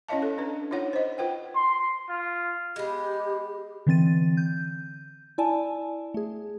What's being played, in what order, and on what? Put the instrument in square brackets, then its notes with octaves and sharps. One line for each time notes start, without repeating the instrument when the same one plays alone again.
[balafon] C#4 E4 C#5 D#5 F5 A5
A4
D4 B4
D#4 F4 C#5 F#5
C5 D#5
F4 B4 F#5 G5
[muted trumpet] C6
F4
[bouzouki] G#3 B3 [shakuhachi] G4
[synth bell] D3 E3 C4 A6 D#7
G6
E4 D5 G#5 A5
A3 G#4